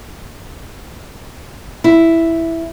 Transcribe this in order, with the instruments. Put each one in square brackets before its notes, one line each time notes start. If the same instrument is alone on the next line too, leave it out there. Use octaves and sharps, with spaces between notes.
[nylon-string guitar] E4